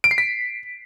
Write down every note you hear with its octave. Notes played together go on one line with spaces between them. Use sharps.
D7
C7
B6